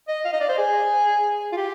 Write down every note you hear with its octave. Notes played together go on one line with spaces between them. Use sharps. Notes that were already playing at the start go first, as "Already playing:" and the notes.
D#5
F5
D#5
D5
C5
G#4
F4
G4